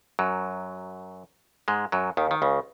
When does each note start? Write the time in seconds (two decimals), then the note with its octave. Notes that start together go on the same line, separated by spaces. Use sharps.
0.19 F#2 F#3
1.68 G#2 G#3
1.92 F#2 F#3
2.17 D#2 D#3
2.31 D#3
2.42 C#2 C#3